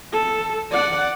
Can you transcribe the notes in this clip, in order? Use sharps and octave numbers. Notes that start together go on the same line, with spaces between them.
A4
D5 F#5